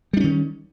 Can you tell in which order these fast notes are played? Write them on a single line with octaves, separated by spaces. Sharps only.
G3 D4 C#4 D#3